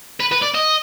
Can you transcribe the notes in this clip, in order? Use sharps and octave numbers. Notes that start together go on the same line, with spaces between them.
B4
B4
D5
D#5